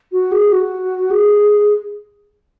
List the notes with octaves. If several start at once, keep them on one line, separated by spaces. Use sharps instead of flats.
F#4
G#4
F#4
G#4